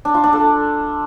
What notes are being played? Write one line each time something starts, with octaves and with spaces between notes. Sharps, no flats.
D4
F4
D4
A4